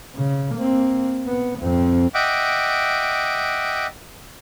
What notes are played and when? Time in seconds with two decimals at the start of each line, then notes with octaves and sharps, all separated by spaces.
0.16 C#3
0.56 A#3 C4
1.27 B3
1.61 F2 C4
2.14 D#5 E5 F#5 G5 D6